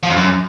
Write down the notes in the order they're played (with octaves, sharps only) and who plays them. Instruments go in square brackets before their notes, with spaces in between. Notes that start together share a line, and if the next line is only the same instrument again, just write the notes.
[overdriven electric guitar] F3
F2
F#2